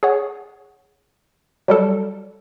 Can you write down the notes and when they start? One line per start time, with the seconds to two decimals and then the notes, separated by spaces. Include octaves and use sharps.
0.03 G#4 C#5 F#5
1.68 F#3 G3 A4